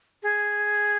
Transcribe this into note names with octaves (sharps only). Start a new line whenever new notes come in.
G#4